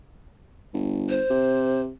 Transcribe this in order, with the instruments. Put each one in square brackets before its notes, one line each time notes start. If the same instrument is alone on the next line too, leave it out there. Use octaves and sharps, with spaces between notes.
[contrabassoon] G1
[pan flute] C5
[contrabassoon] C3